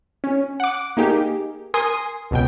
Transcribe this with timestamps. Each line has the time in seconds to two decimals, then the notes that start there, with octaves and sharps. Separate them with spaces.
0.24 C#4
0.60 F#5 D6
0.97 A#3 D#4 G4 G#4
1.74 A#4 G#5 C6 D#6
2.31 C#2 B2 G5